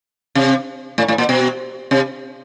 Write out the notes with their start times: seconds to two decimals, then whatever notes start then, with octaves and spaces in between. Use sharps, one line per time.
0.35 C3
0.98 A2
1.08 A2
1.18 A#2
1.29 B2
1.91 C3